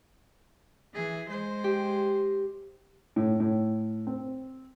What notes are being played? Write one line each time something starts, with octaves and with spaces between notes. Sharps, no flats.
E3 G#4
G#3 C5
G4
A2
A2
C4